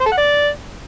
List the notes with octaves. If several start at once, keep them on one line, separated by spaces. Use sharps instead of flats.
C5
A4
F#5
D5